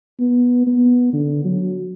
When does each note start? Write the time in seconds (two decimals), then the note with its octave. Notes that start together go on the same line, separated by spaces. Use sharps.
0.20 B3
0.67 B3
1.13 D3
1.44 F#3